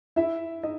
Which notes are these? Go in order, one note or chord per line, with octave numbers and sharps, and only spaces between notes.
E4 E5
D#4 D#5